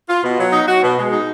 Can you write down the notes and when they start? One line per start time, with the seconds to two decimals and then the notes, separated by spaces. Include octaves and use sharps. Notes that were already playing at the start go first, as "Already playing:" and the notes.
0.09 F4
0.23 B2
0.38 F#3
0.52 D#4
0.67 F#4
0.82 B2
0.98 G#3
1.12 D#4